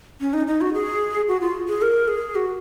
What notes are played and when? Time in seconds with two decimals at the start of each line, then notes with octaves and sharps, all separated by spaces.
0.21 C#4
0.33 D#4
0.47 D#4
0.61 F#4
0.74 G#4
1.28 F#4
1.41 F4
1.68 G#4
1.82 A#4
2.08 G#4
2.35 F#4